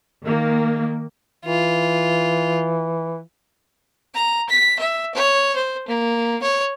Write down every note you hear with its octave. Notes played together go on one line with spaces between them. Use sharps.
D#3 A#3
E3 F4
A#5
B6
E5
C#5
C5
A#3
C#5